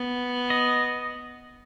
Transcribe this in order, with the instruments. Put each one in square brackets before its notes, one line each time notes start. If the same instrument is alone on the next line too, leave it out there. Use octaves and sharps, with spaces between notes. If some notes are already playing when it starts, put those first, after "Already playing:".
Already playing: [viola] B3
[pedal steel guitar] D#5